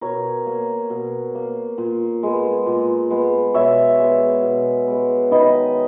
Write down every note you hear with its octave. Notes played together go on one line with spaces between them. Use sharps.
B2 A#4 C#5
A#3
B2
A#3
A#2
G#3 B3
A#2
G#3 B3
B2 C#5 E5
G#3 B3
B2
G#3 B3
D#3 B4 D#5